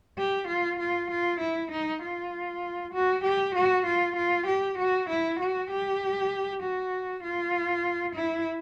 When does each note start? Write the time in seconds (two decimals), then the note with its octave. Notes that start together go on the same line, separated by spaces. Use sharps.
0.18 G4
0.48 F4
0.79 F4
1.10 F4
1.40 E4
1.71 D#4
2.03 F4
2.94 F#4
3.24 G4
3.55 F#4
3.86 F4
4.16 F4
4.47 G4
4.78 F#4
5.09 E4
5.40 F#4
5.70 G4
6.62 F#4
7.23 F4
8.15 E4